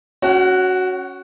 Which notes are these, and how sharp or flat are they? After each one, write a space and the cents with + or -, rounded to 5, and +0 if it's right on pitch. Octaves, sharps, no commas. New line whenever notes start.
C#4 +0 F#4 +0 F#5 +40